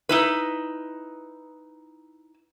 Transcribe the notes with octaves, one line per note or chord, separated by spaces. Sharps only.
D#4 E4 B4